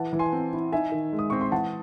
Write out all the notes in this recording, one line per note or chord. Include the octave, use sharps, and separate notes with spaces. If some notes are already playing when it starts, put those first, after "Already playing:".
Already playing: E3 F#5 A5
E3
G#5 C6
C4
E4
D#4 E5 G#5
D#3
G#3
D#6
C4 C#6
C6
E3 F#5 A5